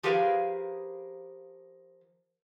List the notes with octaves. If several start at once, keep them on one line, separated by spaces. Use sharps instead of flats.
F3 G4 G#4 A#4 B4 F5